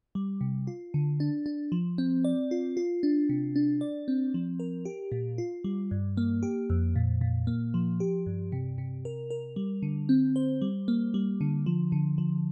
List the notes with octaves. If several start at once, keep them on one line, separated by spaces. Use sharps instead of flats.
G3
C3
F4
D3
D4
D4
F3
C4
D5
F4
F4
D4
C3
D4
D5
C4
F3
A#4
G4
A#2
F4
G3
G2
A#3
G4
F2
A#2
A#2
A#3
F3
G4
G2
C3
C3
A#4
A#4
G3
D3
C4
C5
G3
A#3
G3
D3
F3
D3
F3